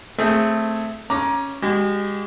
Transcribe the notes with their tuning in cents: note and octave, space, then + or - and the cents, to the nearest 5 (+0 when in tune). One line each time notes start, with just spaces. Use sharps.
A3 +5 C4 +0 G#4 +0
C#4 +0 A#5 +25 D6 +0
G#3 -30 G4 -45